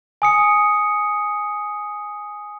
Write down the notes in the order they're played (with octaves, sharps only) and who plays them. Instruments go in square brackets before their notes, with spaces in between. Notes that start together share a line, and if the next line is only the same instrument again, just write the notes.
[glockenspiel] G#5 D#6 C#7